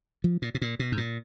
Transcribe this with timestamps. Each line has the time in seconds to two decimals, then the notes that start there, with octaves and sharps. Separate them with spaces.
0.24 F3
0.42 A#2
0.55 B2
0.62 A#2
0.79 B2
0.92 G#2
0.97 A#2